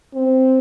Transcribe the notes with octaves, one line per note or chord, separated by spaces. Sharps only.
C4